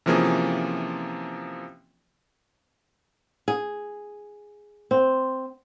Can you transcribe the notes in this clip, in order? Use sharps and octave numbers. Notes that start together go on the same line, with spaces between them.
C3 E3 F3 A#3 C#4 G#4
G#4
C4